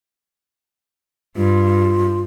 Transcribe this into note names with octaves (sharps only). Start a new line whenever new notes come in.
G2 F4